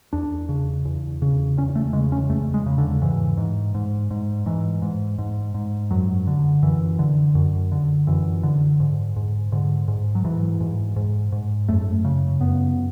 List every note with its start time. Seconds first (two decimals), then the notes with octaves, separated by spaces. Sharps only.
0.13 E2 D4
0.49 C#3
0.85 E2
1.22 C#3
1.57 E2 C#4
1.75 A3
1.93 C#3 G#3
2.12 C#4
2.29 E2 A3
2.54 G#3
2.66 C#3
2.78 D3
3.02 G#2 E3
3.38 G#2
3.75 G#2
4.11 G#2
4.46 G#2 E3
4.82 G#2
5.18 G#2
5.54 G#2
5.91 F#2 F#3
6.27 D3
6.62 F#2 E3
6.99 D3
7.35 F#2
7.72 D3
8.07 F#2 E3
8.43 D3
8.80 G#2
9.16 G#2
9.52 G#2 D3
9.88 G#2
10.15 F#3
10.24 G#2 E3
10.61 G#2
10.96 G#2
11.32 G#2
11.69 F#2 A3
12.05 C#3
12.40 F#2 B3